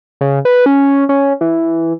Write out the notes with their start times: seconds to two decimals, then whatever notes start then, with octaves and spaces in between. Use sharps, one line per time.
0.21 C#3
0.45 B4
0.66 C#4
1.09 C#4
1.41 E3